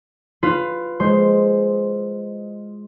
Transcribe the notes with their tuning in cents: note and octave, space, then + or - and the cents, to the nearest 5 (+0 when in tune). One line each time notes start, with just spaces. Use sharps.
F4 +0 B4 +15
G#3 +0 C5 +0